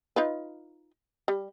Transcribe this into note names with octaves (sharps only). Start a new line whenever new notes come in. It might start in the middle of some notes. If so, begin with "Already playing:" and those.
D#4 F4 B4
G3